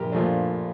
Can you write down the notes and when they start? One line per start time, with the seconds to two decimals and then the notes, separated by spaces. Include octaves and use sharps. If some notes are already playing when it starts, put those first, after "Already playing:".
Already playing: A#1 A#2 D4 G4 A#4
0.12 A#2 F3 A3 D4